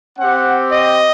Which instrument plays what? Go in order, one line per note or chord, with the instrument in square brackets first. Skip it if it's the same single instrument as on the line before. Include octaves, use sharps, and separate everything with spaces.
[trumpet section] C4 G4 F#5
D#5